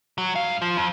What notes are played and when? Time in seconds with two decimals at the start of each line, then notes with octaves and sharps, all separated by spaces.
0.18 F#3
0.36 G2 F5
0.62 F3
0.77 F2